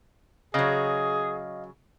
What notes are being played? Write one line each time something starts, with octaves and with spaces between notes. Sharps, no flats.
C#3 F#3 G#4 D#5 F5